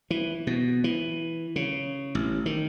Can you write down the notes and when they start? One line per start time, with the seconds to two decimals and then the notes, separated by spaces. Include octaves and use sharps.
0.11 E3
0.47 B2
0.84 E3
1.56 C#3
2.15 A1
2.46 D#3